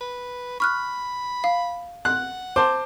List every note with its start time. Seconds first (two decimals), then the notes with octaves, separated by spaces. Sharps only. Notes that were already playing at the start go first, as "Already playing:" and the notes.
0.01 B4
0.60 B5 C#6 F6 F#6
1.44 F5
2.05 F#5 F#6
2.56 C5 A5 D6